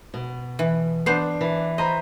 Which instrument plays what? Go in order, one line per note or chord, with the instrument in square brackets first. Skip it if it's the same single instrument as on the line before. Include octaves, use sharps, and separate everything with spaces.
[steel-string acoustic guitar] B2
[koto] E3
[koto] B3 C5 [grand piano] D4 C7
[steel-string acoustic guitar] E3
[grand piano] C5 A#5 B5 [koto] D#5